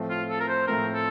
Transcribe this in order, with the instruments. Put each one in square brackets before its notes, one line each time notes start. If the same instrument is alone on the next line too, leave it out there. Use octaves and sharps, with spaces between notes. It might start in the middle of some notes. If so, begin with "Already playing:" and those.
Already playing: [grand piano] A2 F3 A3 C4
[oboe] F4
A4
A#4
C5
[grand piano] A2 F3 A3 C4 [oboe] A#4
[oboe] A4